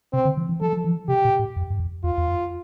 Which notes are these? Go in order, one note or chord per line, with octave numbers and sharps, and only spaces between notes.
C3 C4
D3
E3
E3
F3 A4
F3
E3
C3 G4
A#2
A2
F2
G2
F2
E2 F4
E2
F2